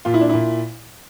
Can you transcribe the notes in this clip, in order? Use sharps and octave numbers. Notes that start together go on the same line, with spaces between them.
A#2 F4
E4
D4
A#2 E4